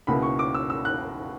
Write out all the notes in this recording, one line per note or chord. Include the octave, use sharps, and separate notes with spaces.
C#2 B2 A#3 E4 B5
C#6
D6
E6
E6
F#6